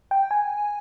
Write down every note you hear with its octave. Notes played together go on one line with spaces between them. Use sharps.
G5
G#5